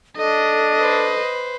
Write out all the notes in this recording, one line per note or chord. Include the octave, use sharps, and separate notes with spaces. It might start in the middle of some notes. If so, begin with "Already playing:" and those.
D4 A4 D#5
B4 C5